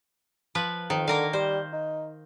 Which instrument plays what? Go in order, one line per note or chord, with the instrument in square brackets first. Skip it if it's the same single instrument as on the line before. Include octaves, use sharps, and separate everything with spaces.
[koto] F3 B4
[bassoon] F2 [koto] D#3
[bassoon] D3 [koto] A#3 A#4 F5
[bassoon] G3 [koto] C5
[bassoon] D#4